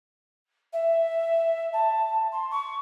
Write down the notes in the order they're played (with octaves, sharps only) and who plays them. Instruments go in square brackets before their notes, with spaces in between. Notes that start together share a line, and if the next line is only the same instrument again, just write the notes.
[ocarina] E5
A5
C6
C#6